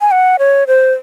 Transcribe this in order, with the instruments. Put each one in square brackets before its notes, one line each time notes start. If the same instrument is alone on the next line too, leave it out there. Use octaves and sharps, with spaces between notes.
[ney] G#5
F#5
C#5
C5